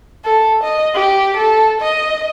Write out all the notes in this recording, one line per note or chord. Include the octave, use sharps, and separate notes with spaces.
A4
D#5
G4
A4
D#5